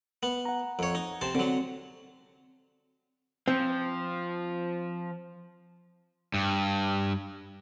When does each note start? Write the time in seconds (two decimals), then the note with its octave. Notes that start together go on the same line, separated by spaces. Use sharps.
0.23 B3
0.45 F#5 A#5
0.79 F2 C#5
0.95 D#4
1.21 C3 C5 A5
1.35 D3 F#3 C4
3.48 F3 C4
6.34 G2